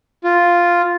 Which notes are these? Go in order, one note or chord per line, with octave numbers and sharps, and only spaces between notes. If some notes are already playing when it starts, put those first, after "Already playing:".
F4